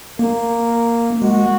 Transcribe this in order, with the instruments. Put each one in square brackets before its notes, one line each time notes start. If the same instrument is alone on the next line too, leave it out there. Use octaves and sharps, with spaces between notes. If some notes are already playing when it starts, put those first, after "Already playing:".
[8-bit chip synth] A#3 [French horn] A#4
[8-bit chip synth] G#3 [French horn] F#4